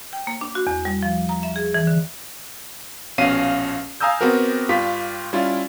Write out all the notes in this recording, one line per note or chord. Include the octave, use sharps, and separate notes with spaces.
G5
A#3
D4
F#4
E2
G3
F3
A#5
E5
G#4
E3
D3
A#1 B2 C#4 F5 C7 D#7
F5 G#5 A#5 D#6 E6 G6
B3 C4 F#4 G4 A#4
G2 F4 G4 B6
G3 C#4 E4 F4